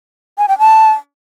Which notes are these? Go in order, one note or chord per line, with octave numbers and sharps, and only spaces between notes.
G#5
G5
A5